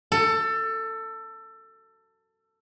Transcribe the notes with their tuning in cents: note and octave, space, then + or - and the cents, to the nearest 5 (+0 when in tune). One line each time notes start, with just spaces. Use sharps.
A4 +20